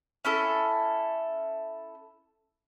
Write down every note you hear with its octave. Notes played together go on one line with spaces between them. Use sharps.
C#4 E4 A4